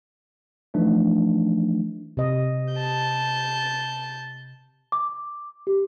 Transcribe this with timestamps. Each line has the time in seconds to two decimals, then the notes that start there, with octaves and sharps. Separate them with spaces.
0.74 E3 F3 A3 D4 D#4
2.17 C3 D#5
2.74 A5 G6
4.92 D6
5.67 G4